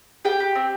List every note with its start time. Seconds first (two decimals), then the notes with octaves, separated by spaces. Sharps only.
0.25 G4 G5
0.40 G4
0.55 C4